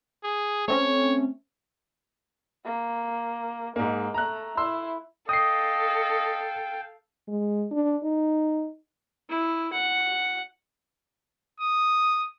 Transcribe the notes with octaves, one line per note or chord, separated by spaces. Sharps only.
G#4
A3 C4 C#4 C#5
A#3
G#2 G#3 A#3
A3 A#5 F#6
E4 C6 E6
A4 D#5 F5 G5 D#6 C7
G#3
D4
D#4
E4
F#5
D#6